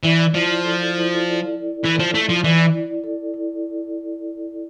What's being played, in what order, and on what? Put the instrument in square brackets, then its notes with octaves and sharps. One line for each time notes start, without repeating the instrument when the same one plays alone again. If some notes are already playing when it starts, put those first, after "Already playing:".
[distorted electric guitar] E3 [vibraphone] D5
[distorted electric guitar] F3 [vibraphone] E4
[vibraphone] A4
E4
D5
E4
[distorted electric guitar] E3 [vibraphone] A4
[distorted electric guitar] F3
[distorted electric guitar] A3 [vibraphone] E4
[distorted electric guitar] F3
[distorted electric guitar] E3 [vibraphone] D5
[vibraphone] E4
A4
E4